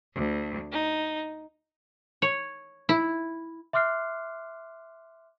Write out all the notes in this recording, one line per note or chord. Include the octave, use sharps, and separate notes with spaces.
D2
D#4
C#5
E4
E5 C6 D6 F6 F#6 C7